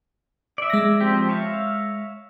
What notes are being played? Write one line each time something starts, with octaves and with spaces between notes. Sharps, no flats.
D5 E5
G#3 A#6
F3 C4 G4
C#5 E5 F5